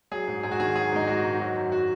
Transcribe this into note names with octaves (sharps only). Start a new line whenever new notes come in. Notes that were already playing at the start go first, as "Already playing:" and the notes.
F#3 G#4
G#2
G#2 G#4
F#4
D#3 G#4
F#3 G#4
G#2 D#4
G#2 F#4
D#3
F#3 F#4
F#2
F#4